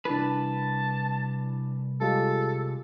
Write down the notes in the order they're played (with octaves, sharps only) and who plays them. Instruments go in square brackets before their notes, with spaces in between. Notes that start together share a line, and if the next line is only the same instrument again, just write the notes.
[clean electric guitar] C2 B4 [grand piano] E3 D4 [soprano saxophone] A5
[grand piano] G3 G#3 F4 [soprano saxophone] A4